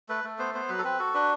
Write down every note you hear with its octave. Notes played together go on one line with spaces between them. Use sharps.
A3 B4
A3
B3 C5
B3 C5
F#3 B4
A4
C4 B4
F#4 A4
D4 B4